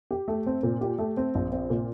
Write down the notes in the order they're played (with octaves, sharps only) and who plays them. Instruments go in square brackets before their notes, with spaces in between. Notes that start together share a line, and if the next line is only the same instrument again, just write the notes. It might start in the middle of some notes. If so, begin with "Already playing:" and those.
[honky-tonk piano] G4
A3
C4
A#2
G4
A3
C4
A#1
C4
A#2